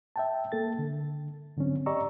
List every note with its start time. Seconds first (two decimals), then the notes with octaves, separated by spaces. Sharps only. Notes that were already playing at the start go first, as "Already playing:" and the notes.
0.16 E5 G5 A5
0.52 A#3 A4 A6
0.79 D3
1.57 G#2 D3 F#3 C4 C#4
1.86 G4 D5 D#5 A#5 C#6 E6